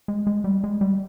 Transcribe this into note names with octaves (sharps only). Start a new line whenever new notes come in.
G#3
G#3
G3
G#3
G3